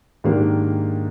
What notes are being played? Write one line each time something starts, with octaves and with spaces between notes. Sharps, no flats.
G#2 D#3 A#3 D4 G4